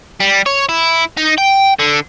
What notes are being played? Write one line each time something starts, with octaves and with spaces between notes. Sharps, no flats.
G3
C#5
E4
D#4
G5
D3